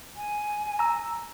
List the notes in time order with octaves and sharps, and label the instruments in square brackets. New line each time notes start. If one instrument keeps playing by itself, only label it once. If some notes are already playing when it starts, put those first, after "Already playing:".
[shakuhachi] G#5
[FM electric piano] A#5 E6